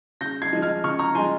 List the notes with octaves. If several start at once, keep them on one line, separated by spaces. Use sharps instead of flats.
C#3 G6 A#6
G#6 C7
F3 G#3
F6 G#6
C#3 C#6 F6
A#5 C#6
F3 G#3 G#5 C6